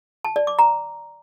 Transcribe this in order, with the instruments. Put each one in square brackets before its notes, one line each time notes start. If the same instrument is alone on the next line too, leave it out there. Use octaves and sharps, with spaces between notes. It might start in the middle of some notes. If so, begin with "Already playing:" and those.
[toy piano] A5
D5
D6
A#5